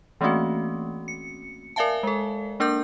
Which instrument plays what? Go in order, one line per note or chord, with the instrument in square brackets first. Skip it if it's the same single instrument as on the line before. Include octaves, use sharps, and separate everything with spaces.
[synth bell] E3 A3 A#3 C4 C#4 F#4
C#7
A#4 D5 E5 F5 G#5 A5
G#3 A4
A#3 D4 A#4 D6 G6